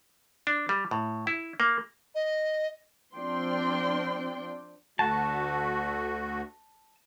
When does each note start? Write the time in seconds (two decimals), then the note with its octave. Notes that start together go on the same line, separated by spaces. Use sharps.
0.47 D4
0.69 G3
0.91 A2
1.27 E4
1.60 A#3
2.15 D#5
3.15 F3 C4 D4 D5 G5 C6
4.99 D2 A3 F#4 A5